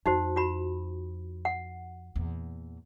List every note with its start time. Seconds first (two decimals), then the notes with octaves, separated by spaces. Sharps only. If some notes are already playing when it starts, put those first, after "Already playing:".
0.06 F2 D#4 F#4 C5
0.36 F4 F#4 B5
1.45 F#5
2.16 E2 A#2